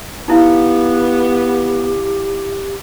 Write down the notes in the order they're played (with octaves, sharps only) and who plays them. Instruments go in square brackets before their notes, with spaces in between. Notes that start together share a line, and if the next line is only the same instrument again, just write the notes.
[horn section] B3 [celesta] D#4 E4 F5 [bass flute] G4